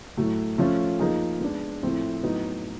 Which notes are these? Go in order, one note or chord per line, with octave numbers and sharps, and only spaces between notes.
A2 F#3 A3
F3 A3 C#4 F4
F3 A#3 D#4 G#4
G#3 B3 D4
A2 F3 A3 C4 E4
A2 F#3 B3 D#4